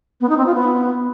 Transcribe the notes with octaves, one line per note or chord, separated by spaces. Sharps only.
B3
D#4
C4
F4
B3